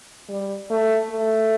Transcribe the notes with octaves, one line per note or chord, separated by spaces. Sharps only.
G3
A3
A3